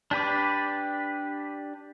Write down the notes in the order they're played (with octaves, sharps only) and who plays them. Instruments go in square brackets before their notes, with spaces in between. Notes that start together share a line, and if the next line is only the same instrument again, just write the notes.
[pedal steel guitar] D4 G4 B4 D5